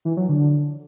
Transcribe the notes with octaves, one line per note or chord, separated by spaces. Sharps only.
E3
F#3
D3